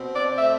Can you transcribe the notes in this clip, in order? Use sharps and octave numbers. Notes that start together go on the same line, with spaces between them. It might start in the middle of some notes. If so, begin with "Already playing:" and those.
Already playing: B2 C4
D5
A3 E5